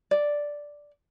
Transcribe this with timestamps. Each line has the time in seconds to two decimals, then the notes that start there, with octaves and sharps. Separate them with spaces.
0.11 D5